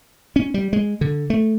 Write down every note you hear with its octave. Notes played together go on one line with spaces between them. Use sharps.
C#4
G3
G#3
D3
A3